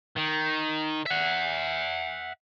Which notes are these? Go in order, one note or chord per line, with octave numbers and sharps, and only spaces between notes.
D#3
E5 F#5